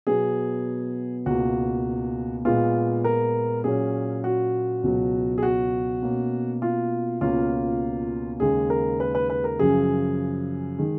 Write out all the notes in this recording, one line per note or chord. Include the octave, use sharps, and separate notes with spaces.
B2 F#3 B3 G#4
C#2 B2 A#3 F#4
A#2 G#3 B3 F4
A#4
A#2 F#3 C#4 G#4
F#4
C#2 B2 F#3
G#4
F#4
B2 A#3 C#4
F4
C#2 B2 A#3 C#4 F4
D#2 C#3 G#3 G#4
A#4
B4
B4
B4
A#4
F#2 C#3 F3 G#4
D#3 G#3